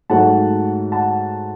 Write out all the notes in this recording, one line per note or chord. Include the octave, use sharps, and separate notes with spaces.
G#2 F#3 A3 F#5 A5
F#5 A5